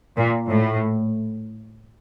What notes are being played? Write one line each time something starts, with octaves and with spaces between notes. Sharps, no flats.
A#2
A2